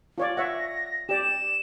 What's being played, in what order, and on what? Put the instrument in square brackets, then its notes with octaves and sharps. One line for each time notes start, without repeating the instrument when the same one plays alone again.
[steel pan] F4 C#5 D5
[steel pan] C#5 E5 F#5 [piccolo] A#6
[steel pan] G4 D5 [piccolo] E7